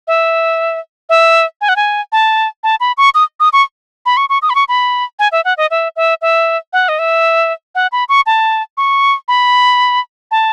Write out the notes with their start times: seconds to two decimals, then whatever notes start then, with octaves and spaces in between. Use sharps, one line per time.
0.08 E5
1.09 E5
1.61 G#5
1.69 F#5
1.76 G#5
2.12 A5
2.64 A5
2.80 B5
2.98 C#6
3.15 D#6
3.40 D#6
3.53 C#6
4.06 B5
4.17 C#6
4.30 C#6
4.42 D#6
4.50 B5
4.55 C#6
4.69 B5
5.19 G#5
5.32 E5
5.45 F#5
5.57 D#5
5.71 E5
5.96 E5
6.22 E5
6.73 F#5
6.89 D#5
6.99 E5
7.75 F#5
7.92 B5
8.09 C#6
8.26 A5
8.77 C#6
9.28 B5
10.31 A5